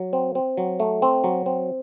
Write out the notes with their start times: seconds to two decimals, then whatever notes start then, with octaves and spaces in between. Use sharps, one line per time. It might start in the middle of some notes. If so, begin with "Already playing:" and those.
Already playing: F#3
0.13 C4
0.35 C4
0.57 F#3
0.80 A3
1.02 C4
1.24 F#3
1.46 C4